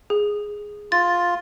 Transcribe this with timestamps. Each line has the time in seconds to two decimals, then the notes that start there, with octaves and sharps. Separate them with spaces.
0.10 G#4
0.92 F4 A6